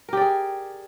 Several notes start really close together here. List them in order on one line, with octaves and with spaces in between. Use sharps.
A#4 G4 D5 G#4